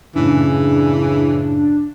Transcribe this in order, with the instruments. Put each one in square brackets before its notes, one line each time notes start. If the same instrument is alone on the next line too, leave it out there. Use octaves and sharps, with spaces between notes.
[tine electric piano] F#2 A2 [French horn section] C#3 [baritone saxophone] E3 [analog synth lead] D4